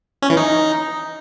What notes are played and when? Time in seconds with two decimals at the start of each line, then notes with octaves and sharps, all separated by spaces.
0.22 C#4
0.30 E3
0.37 D#4